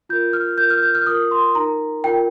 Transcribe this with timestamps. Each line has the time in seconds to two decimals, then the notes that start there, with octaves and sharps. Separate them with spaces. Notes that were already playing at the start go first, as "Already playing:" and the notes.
0.09 F4 A#4 G6
0.33 F6
0.58 F4 A#4 G6
0.70 F6
0.83 G6
0.95 F6
1.07 F4 A#4 D#6
1.31 C6
1.55 D#4 A#4 A#5
2.04 F4 A#4 G5